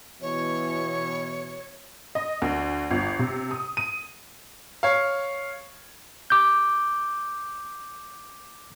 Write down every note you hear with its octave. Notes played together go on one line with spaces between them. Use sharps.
B2 E3 C#5
D#5
D2
G1
C3
D#6
D#7
C#5 F5
D6 G6